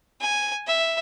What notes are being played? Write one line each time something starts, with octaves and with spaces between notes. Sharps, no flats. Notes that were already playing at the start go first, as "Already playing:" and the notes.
G#5
E5